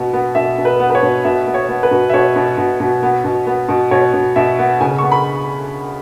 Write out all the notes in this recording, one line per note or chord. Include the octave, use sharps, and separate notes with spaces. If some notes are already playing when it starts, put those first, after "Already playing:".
Already playing: B2 B3
B3
B2 E5
B2
B4
B3
B4
C#5
B2
B2 E5
B3
C#5
B3
B4
B2
E5
B2 C#5
B2
B2
B2
B3
B2
B3
B2
B2 C#5
B2
B2 E5
B3
C#3 G#5
B3 C#6
B5